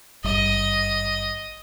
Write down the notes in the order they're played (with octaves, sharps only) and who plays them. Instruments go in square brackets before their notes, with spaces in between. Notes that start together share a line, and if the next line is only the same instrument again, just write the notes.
[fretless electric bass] G#1 G2 [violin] D#5